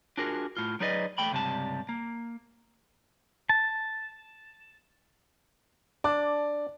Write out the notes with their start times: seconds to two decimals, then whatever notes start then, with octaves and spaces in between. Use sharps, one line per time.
0.17 D4 F4 F#4 G#4 A#4
0.57 A2 F4
0.80 F#3 D#4 G#4 B4 D5 D#5
1.18 E2 A3 G5 B5
1.32 C#2 G2 C3 G3 A5
1.89 A#3
3.49 A5
6.04 D4 D5